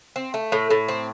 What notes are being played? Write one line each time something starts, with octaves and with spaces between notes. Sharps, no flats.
C4
A3
A2
A2
C4